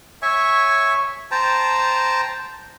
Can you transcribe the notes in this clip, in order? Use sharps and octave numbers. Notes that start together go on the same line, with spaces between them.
C#5 E5 G#5 C#6
C5 G5 A5 A#5